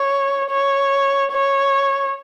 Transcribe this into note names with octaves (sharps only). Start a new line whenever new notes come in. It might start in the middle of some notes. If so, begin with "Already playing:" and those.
Already playing: C#5
C#5
C#5